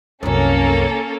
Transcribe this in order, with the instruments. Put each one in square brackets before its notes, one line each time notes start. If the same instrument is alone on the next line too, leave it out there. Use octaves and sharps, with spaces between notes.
[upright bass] C2 F#2 [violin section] A#3 C#4 A4